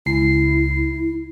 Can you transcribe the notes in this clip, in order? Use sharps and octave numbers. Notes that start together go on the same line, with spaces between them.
C#2 E4 C7